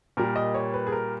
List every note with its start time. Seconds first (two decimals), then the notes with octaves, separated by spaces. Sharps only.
0.17 A#2 G3 A#4
0.36 D#5
0.54 C#5
0.74 B4
0.87 G#4
0.92 A#4